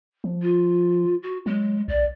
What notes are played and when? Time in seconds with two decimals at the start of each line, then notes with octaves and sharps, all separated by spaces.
0.24 F3
0.42 F4
1.23 F#4
1.46 F#3 G#3
1.88 B1 D5